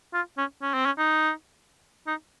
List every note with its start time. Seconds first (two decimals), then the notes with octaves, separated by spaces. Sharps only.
0.14 F4
0.37 C#4
0.62 C#4
0.74 C4
0.86 C#4
0.98 D#4
2.07 D#4